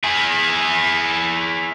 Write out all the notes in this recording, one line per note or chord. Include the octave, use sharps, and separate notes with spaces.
E4 G#4